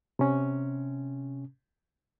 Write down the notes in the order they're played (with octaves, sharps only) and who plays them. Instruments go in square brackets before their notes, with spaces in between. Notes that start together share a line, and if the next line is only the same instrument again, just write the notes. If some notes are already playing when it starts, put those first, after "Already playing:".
[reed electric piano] C3 C#4